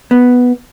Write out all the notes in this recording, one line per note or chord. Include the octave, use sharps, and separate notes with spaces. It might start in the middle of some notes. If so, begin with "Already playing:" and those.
B3